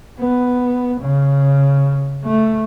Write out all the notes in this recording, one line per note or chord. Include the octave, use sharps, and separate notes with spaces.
B3
C#3
A3